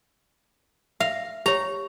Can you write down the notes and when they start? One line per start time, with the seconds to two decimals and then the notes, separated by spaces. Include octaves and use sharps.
1.00 E5 F5
1.46 G4 C#5 A#5